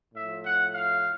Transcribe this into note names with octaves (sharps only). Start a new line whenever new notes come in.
A2 F3 E5
F#5
F5